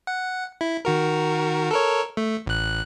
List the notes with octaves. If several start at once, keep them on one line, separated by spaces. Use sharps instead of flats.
F#5
E4
D#3 F#4 A#4
A4 A#4 C#5
A3
A1 F#6